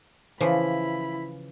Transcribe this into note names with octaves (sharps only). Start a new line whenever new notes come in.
C#3 E3 F3 E4 B5